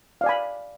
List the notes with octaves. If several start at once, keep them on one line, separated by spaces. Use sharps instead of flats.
D5 F5 G#5 B5